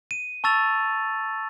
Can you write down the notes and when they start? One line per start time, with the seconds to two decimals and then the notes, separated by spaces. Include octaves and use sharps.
0.11 D#7
0.44 A5 C#6 E6 A6 F7